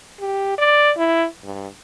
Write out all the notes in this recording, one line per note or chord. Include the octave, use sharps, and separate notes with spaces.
G4
D5
E4
G2